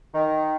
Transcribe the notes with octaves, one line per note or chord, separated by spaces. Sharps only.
D#3